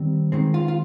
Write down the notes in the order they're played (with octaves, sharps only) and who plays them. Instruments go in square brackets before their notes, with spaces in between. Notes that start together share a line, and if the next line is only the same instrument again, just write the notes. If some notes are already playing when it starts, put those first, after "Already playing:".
Already playing: [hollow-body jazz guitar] D#3 G3 C4
D#3 G#3 C4
F4
F4